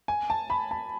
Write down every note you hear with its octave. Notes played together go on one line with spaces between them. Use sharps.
G#5
A5
B5
A5